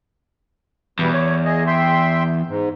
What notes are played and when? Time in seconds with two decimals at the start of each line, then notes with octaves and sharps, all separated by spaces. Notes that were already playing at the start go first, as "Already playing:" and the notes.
0.99 E2 B2 E3 G3
1.13 C#5
1.45 G#4 D#5
1.67 E5 G5 C6
2.48 G#2